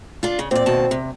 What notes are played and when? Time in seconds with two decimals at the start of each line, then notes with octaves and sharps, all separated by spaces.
0.23 D4 F4
0.39 C#3
0.51 A#2 C4 D5
0.66 D#2 B2 A5
0.91 C3